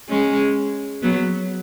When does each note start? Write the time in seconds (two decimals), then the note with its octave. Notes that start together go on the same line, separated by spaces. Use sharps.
0.09 G#3 C#4
1.02 F#3 B3